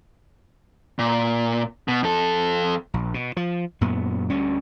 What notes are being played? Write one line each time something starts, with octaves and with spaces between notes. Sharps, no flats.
A#2
B2
F2 A4
A#1
B2
F3
F#2 A#2 B3
D2 G3 C#4